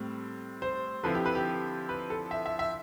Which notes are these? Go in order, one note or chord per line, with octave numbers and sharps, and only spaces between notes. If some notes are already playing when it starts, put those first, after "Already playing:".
Already playing: A2 G3 C4
C5
D3 F3 C4 E4 B4
G4
B4
G4
B4
A4
E5
E5
E5